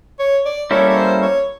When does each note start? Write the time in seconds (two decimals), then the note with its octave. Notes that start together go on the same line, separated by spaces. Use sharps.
0.19 C#5
0.46 D5
0.71 G3 A#3 C#4 E4 A4 C#5
0.89 C#5
0.97 C5
1.22 C#5